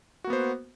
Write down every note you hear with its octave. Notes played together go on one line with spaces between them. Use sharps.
A#3 B3 F#4 C5